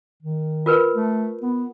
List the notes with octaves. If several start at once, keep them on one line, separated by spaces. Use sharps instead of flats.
D#3
F4 A#4 B4
A3
B3